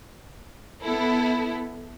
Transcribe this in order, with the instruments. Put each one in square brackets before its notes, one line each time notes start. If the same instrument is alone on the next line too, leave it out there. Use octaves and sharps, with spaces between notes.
[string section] B3 E4 A4